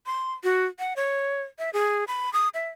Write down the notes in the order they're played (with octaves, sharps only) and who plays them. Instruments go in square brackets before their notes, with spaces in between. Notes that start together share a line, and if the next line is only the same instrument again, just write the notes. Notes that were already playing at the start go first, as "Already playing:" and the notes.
[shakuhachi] C6
F#4
F#5
C#5
E5
G#4
B5
D#6
E5